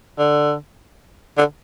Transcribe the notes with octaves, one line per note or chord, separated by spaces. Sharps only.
D3
D3